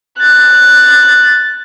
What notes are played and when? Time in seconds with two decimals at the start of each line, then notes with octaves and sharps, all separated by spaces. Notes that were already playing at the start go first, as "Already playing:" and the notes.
0.19 F#6 A6